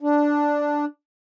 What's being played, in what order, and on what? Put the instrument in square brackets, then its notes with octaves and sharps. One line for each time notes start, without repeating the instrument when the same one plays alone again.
[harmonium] D4